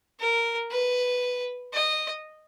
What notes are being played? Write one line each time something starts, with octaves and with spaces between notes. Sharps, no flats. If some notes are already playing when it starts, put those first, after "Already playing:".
A#4
B4
D#5